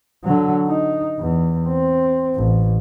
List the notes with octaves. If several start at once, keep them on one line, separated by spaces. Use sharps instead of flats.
D3 F#3
D#4
E2
C4
A1